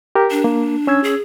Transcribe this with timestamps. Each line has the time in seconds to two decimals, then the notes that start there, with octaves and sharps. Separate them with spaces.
0.15 G4 A#4
0.31 D4
0.44 A#3
0.87 C#4 E6 G#6
1.04 G#4